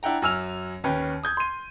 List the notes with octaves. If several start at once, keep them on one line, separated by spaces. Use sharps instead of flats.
D4 E4 F#5 G5 A#5
F#2 G#5 E6 F6 F7
D#2 C#4 B4 G5
D#6 G6 G#6
C6 D#7